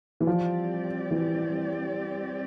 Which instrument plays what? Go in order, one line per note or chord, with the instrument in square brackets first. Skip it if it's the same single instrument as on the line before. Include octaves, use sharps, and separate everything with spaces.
[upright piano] E3
[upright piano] F3 [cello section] G3 C4 G4 D5
[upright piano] E3